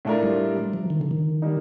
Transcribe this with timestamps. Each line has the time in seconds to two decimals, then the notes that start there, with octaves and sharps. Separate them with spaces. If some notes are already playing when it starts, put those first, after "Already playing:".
0.05 A2 A3 D4 F4 A#4
0.23 G3
0.74 F3
0.90 D#3
1.01 D3
1.11 D#3
1.42 G3 A#3 D#4